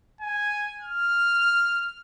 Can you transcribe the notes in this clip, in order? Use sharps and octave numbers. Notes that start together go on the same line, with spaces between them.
G#5
F6